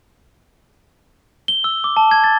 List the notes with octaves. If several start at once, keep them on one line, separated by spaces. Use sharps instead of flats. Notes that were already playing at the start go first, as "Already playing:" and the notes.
G7
E6
D6
A5
G#6
A6